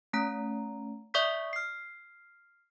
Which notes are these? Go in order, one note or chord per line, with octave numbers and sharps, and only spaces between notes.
A3 C#4 A#5
D5 E5 C#6 D#6 G6 B6
F6 C7